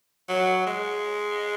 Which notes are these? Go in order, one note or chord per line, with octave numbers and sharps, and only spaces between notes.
F#3
G#3